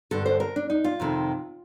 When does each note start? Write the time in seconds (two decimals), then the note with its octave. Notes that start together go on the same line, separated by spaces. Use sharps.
0.11 G2 D3 A4
0.26 C5
0.40 A#4
0.56 D4
0.70 D#4
0.84 F4
1.00 F2 C3 D#3